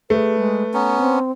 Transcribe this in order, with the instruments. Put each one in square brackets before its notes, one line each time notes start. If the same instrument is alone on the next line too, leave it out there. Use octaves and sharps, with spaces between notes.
[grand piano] A3 [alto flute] G#4 [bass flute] B4
[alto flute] G#3
[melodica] B3 C#4 [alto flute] A#5
[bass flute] C4